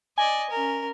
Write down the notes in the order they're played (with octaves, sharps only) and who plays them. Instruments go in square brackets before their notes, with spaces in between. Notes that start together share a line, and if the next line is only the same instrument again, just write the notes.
[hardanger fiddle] D5 D#5 [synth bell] G#5
[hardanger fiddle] C#4 A#4